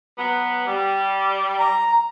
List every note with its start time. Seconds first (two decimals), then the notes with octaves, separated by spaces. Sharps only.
0.16 F#3 B3
0.65 G3
1.59 A#5